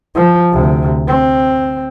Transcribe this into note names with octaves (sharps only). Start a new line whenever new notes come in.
F3
D2 C3
C4